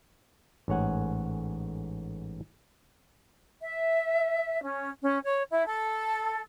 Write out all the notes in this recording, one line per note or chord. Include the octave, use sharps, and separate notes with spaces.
A1 G#2 C#5 F#5 G#5
E5
C#4
C#4
C#5
E4
A4